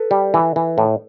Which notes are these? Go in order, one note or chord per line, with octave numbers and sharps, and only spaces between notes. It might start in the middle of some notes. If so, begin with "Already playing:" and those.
Already playing: A4 B4
G3
E3
E3
A2